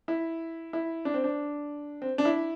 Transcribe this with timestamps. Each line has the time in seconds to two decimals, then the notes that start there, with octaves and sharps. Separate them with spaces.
0.08 E4
0.73 E4
1.05 D4
1.14 C4
1.24 D4
2.02 C4
2.18 D4
2.25 E4